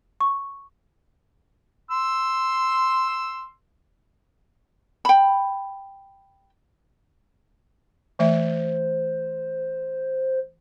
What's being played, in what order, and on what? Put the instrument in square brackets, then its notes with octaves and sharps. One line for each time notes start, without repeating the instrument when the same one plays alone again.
[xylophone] C#6
[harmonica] C6 E6
[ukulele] G5 B5
[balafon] E3 A3 E5 [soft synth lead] C5